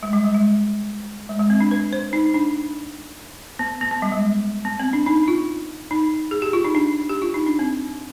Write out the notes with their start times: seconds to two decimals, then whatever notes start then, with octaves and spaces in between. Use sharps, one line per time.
0.03 G#3
0.13 G3
0.24 G#3
0.34 G#3
1.29 G#3
1.39 G#3
1.50 C4
1.60 D4
1.71 B4
1.93 C5
2.13 D#4
2.34 D4
3.59 B3
3.81 B3
3.91 B3
4.02 G3
4.12 G#3
4.65 B3
4.80 C4
4.93 D4
5.06 D#4
5.28 F4
5.91 D#4
6.31 G#4
6.42 G4
6.53 F4
6.65 D#4
6.75 D4
7.09 G4
7.22 F4
7.34 D#4
7.46 D4
7.59 C4